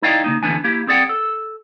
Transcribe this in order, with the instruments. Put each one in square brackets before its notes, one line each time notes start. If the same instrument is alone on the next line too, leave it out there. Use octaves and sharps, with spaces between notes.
[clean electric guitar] D#4 E4 D5 D#5 F5 G5
C#3 A#3 D#4
D#2 D3 E3 B3 D4 G#5
A#3 E4 G4
C4 G#4 D5 F#5 G5
A4